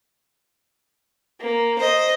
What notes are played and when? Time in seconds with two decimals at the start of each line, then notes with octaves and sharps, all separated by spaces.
1.41 A#3
1.79 C5 D#5